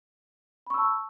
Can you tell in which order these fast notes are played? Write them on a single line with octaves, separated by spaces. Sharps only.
B5 C#6 E6 A5